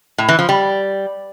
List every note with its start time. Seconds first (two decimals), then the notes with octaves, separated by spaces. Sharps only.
0.18 A2
0.29 E3
0.39 F3
0.49 G3